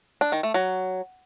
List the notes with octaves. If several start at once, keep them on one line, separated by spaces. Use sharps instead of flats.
D4
D#3
A3
F#3